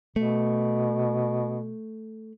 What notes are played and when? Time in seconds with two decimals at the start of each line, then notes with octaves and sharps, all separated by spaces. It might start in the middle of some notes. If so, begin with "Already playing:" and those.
0.16 B2 A3